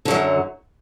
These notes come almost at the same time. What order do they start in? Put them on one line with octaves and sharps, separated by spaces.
D3 F#3 F#2